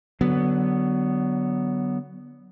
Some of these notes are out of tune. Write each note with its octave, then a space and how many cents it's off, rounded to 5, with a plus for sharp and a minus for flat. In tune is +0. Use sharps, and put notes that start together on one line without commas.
D3 +0 F#3 +20 B3 +0